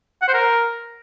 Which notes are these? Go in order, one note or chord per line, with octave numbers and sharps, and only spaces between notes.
F#5
C5
A#4